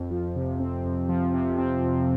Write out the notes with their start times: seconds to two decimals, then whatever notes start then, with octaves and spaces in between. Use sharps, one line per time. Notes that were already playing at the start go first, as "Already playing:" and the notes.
Already playing: F2
0.10 F3
0.36 C3
0.60 C4
0.85 F2
1.09 F3
1.34 C3
1.58 C4
1.83 F2